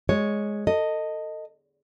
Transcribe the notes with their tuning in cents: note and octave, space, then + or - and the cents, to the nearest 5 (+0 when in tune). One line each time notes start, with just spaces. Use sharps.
G#3 +0 C#5 +0
A4 +30 D#5 +0